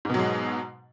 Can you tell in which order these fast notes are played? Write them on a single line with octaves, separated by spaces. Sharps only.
G#2 B2 F#3 G#3